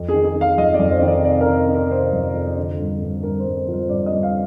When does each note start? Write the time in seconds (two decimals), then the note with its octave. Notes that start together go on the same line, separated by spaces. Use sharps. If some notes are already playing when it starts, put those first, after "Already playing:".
Already playing: F2
0.09 G#4
0.14 D#3
0.24 G#4
0.35 D#3
0.41 F5
0.58 F2 D#5
0.74 D5
0.79 F2
0.91 C5
1.02 D#3
1.08 D5
1.24 C3 D5
1.41 A#4
1.46 D#3
1.68 D#3
1.74 A#4
1.91 C3 C5
2.13 F2
2.35 F2
2.57 D3
2.79 G2
3.01 G2
3.23 G2 A#4
3.40 C5
3.45 G2
3.57 C5
3.68 F3
3.74 C5
3.89 G2 D5
4.06 D#5
4.12 G2
4.23 F5